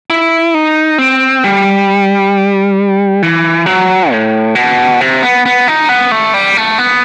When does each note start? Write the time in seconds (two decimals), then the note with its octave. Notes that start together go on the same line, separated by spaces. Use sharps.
0.10 E4
0.54 D#4
0.98 C4
1.44 G3
3.22 E3
3.66 F#3
4.11 A2
4.55 B2
5.01 C3
5.23 B3
5.46 B3
5.68 D#4
5.89 B3
6.12 A3
6.34 G3
6.57 A3
6.78 B3